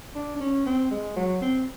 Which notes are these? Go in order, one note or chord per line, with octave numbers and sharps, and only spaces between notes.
D4
D4
C#4
C4
G#3
F#3
C4